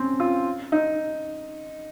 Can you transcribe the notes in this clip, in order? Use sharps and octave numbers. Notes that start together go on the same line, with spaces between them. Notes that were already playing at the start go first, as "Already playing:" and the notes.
Already playing: C4 C#4
F4
D#4